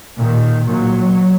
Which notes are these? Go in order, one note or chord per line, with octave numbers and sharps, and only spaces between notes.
A#2 D#3
A#2 F#3